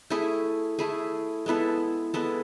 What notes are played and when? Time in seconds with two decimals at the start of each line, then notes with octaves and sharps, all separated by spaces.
0.10 A3 E4 G#4
0.79 A3 E4 G#4
1.46 G#3 B3 E4 A4
2.14 G#3 B3 E4 A4